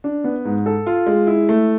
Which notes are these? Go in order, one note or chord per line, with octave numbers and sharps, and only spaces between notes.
D4
B3
G#2
A4
F4
G#3
E4
A3